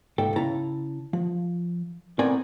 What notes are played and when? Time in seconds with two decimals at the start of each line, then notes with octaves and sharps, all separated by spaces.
0.18 C#2 G#2 A4 G5
0.36 C#3 E4 A5 A#5
1.13 F3
2.19 A2 B3 C4 A#4 D5 G#5